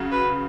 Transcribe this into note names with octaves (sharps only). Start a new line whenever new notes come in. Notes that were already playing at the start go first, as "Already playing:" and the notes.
Already playing: C#3 F#3
B4